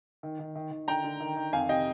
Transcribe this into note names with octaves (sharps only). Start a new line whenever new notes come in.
D#3
D#3
D#3
D#3
D3 G5 A#5
D3
D#3
D#3
F2 F5 G#5
C3 D#5 G5